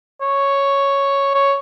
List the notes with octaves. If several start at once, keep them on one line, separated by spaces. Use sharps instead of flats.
C#5
C#5